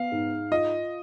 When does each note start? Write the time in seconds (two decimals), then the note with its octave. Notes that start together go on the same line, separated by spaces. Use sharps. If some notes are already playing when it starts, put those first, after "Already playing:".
Already playing: B3 F5
0.12 G#2
0.52 F4 D#5